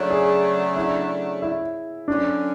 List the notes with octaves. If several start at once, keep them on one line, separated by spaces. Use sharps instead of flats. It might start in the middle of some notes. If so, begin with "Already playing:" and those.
Already playing: C#3 F#3 A3 D4 C#5
G#4
E4
E4
D3 F#3 C#4 D4